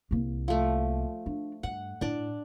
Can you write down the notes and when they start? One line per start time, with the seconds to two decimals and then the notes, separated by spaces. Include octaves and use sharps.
0.11 C2 A#3
0.48 F3 A3
1.26 D4
1.63 G2 F#5
2.01 A2 D4 D5